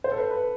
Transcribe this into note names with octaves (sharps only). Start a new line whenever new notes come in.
C5
A4
B4
B4